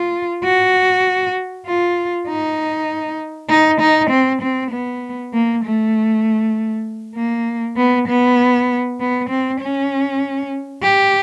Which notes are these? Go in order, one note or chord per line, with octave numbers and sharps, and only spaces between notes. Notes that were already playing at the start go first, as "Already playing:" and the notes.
Already playing: F4
F#4
F4
D#4
D#4
D#4
C4
C4
B3
A#3
A3
A#3
B3
B3
B3
C4
C#4
G4